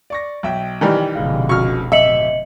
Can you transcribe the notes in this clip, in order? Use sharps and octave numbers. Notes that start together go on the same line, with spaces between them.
D5 C#6 A#6
B1 E5 G5
D#3 E3 G3
F1 B2 D3 G#3 F5
C#2 F#4 C#6 F6
D1 D#5 E5 C#7 F#7